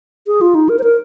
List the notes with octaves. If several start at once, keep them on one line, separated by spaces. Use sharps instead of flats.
G#4
F4
D#4
A#4
C5
A#4